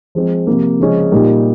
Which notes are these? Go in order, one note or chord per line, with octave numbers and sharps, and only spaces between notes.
F3 G#3 C4
C3 F3 A#3
C#3 F3 G#3 C#4
A#2 G3 A#3 D#4